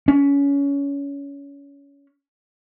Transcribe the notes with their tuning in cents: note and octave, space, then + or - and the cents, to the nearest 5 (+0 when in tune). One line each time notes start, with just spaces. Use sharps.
C#4 +25